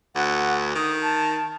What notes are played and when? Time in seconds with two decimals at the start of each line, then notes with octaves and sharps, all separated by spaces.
0.16 D2 F#5
0.75 D#3 D#6
1.03 A5